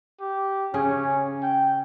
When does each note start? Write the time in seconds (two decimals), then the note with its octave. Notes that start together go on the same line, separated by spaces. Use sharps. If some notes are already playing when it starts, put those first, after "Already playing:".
0.21 G4
0.74 C#3 C#4 G#4
1.43 G5